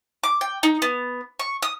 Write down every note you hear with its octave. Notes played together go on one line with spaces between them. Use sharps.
D6
G5
D#4
B3
C#6
D#6